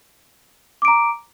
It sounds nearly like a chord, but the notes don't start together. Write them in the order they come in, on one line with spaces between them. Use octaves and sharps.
D6 D7 A#5